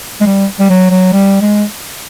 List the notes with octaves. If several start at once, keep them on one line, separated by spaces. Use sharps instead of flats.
G#3
G3
G3
F#3
F#3
G3
G#3